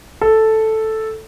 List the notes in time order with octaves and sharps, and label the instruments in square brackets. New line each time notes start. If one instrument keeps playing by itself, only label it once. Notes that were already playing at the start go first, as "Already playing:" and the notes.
[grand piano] A4